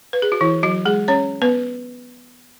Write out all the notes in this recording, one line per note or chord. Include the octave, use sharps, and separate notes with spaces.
B4
G#4
F#4
E3 E4
F#3 F#4
G#3 G#4
C#4 C#5
B3 B4